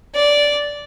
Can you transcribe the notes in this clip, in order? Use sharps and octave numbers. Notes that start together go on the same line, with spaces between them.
D5